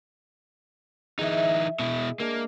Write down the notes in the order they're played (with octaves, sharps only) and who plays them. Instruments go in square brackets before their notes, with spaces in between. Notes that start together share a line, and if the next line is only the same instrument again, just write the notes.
[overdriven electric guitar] E3 D#4 [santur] G#4 D#5 E5
[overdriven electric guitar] B2 E4
[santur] G#3 D4 A#5 [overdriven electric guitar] A#3